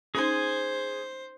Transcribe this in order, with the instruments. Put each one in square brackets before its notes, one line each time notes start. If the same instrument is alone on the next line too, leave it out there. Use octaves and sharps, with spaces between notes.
[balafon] C#4 D#4 [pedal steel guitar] G#4 G#5 [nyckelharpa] C5